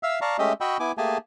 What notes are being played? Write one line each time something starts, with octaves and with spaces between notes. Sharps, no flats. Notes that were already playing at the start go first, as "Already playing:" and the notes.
E5 F5 E6
D5 F5 A5 A#5 C#6
G#3 A3 C#4 G4 D#5 E5
F#4 D#5 G5 B5 C#6 E6
B3 E4 G#5 D6
A3 A#3 G4 G#4 G#5 A5